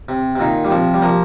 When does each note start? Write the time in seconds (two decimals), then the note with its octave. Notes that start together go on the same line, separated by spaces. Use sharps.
0.09 C3
0.35 C3
0.39 A#2 D#3
0.65 G3
0.70 C3 F3
0.94 G3
1.02 F3 A#3